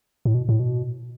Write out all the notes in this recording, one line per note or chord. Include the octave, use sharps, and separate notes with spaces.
A2
B2
A2
B2